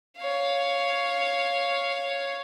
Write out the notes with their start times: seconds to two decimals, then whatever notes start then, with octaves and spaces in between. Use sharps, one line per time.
0.18 C#5 F5